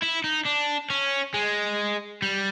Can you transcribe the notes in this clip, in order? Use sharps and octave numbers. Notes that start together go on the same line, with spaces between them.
E4
D#4
D4
C#4
G#3
G3